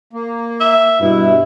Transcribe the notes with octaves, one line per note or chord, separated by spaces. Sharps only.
A#3
E5
G2 B2 E4